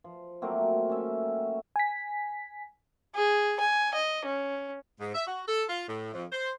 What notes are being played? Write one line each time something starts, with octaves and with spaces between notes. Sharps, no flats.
F3
F#3 A3 A#3 C4
C#4 E5
G#5 B6
G#4
G#5
D#5
C#4
G#2
E5
F#4
A4
F4
A2
F2
C5